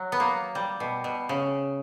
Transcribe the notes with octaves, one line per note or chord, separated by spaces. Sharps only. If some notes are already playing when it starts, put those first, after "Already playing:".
Already playing: F#3
B3
A#3
G3
B2
B2
C#3